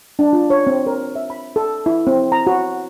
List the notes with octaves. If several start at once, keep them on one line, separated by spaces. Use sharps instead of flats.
D4
F4
C#5
C4
A#4
E5
B5
A4
E4
C4
A#5
F#4